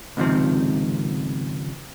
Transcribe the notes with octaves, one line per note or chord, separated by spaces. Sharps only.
C#2 G#2 C3 D#3 F3 C4